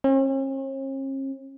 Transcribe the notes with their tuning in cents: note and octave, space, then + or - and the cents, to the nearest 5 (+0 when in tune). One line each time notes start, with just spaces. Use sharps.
C#4 -45